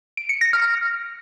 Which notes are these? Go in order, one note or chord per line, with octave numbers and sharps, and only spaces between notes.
D7
C#7
A#6
F6